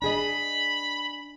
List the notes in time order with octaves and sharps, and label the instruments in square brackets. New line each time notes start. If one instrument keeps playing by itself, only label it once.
[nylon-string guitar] D4 G#4 D#5 [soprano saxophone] B5